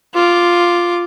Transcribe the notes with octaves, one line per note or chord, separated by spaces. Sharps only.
F4 D6